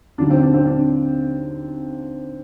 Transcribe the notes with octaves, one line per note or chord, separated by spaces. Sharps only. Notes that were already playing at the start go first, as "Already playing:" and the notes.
D#2 D3 F#3 D4
C4
D4
C4
D4